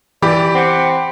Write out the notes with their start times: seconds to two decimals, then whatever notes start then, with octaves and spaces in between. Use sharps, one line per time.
0.22 E3 G4 D5 B5
0.55 C4 F#5